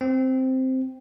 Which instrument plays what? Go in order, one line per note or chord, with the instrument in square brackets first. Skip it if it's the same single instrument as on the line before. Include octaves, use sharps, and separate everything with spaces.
[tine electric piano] C4